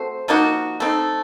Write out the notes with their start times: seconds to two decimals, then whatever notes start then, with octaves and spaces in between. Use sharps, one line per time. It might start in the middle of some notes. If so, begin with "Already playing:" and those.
Already playing: A3 C4 F#4 C5
0.28 F3 A#3 D#4 F#4
0.80 A3 C4 D#4